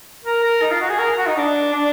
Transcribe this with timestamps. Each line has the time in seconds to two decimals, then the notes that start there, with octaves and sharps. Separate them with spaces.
0.25 A#4
0.44 A#4
0.62 D#4
0.71 F4
0.81 F#4
0.89 G#4
0.99 A#4
1.18 F#4
1.27 D#4
1.37 D4
1.74 D4